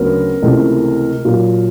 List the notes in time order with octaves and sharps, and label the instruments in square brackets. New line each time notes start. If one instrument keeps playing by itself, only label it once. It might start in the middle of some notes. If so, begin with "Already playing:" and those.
Already playing: [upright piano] D2 C#3 F#3 B3 A#4
C#2 C3 E3 A3
A#2 F#3 A#3